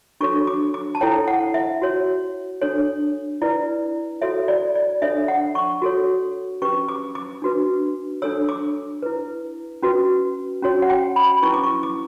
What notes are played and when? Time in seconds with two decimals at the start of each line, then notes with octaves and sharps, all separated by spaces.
0.20 D4 F#4 A4 C#5 C#6
0.47 D6
0.74 D6
0.95 A5
1.01 E4 A4 C#5 G5
1.28 F#5
1.54 E5
1.82 F#4 C#5
2.62 D4 A4 C#5
3.42 E4 B4 D5
4.22 F#4 A4 C#5 E5
4.48 D5
4.75 D5
5.02 D4 A4 C#5 E5
5.28 F#5
5.55 C#6
5.82 F#4 A4 C#5
6.62 C#4 G4 B4 C#6
6.89 D6
7.15 D6
7.42 D4 F#4 B4
8.22 D4 A4 C#5 E6
8.49 D6
9.03 E4 B4
9.82 C#4 F#4 B4
10.62 C#4 F#4 C#5
10.82 F#5
10.90 G5
11.16 B5
11.42 C#4 E4 B4 C#6
11.54 D6
11.63 C#6
11.83 D6